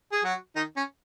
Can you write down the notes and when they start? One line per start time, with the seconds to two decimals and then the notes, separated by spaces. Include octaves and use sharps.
0.12 G#4
0.24 F#3 F#4
0.56 D#3 D#4
0.77 C#4